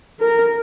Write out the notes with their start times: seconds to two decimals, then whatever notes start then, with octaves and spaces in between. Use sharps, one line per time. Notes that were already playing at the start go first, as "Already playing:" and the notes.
0.20 A#4